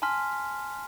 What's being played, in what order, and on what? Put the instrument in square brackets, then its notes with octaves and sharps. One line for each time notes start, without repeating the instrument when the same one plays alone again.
[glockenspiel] G#5 A5 C6 F6 B6